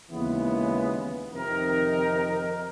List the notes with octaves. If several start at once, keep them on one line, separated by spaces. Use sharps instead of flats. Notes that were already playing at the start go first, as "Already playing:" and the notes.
D#2 C#3 E3 G#3 B3
F2 C3 D#3 D#4 A#4